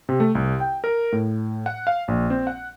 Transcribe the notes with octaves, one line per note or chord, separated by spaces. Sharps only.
C3
A3
C2
G5
A#4
A2
F#5
F5
A#1
C4
F#5